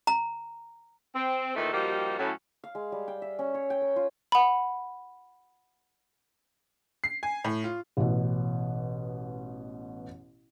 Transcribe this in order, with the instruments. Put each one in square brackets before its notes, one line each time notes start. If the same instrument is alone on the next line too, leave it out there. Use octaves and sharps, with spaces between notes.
[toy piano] A#5
[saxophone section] C4
A#2 D#3 E3 A3 D#4 A4
F3 G3 A#3 D#4 F#4 G4
A2 F#3 C#4
[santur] F5
G#3
G3
G5
E5
C#4
C#5
G5
A#4
F4
[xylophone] F#5 B5
[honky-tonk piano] C7
G#5
A2
F4
[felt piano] A1 B2